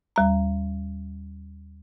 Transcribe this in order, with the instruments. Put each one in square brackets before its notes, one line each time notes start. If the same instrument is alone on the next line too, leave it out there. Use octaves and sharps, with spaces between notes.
[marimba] D#2 G3 A#5